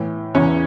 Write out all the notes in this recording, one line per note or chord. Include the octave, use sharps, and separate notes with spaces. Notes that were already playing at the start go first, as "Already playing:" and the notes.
Already playing: A2 E3
E2 C#3 E3 C#4 C#5